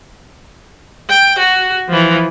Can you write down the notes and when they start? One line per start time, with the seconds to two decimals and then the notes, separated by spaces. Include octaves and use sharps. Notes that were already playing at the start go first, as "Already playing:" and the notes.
1.09 G5
1.39 F#4
1.88 E3 F3